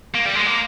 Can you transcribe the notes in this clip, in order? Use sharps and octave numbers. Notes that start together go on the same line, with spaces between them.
A#3
G3
G#3
A#3